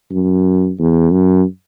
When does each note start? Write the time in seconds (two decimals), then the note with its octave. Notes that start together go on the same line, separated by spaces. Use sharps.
0.11 F#2
0.79 E2
1.12 F#2